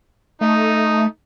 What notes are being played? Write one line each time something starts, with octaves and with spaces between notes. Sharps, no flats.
A3 D#4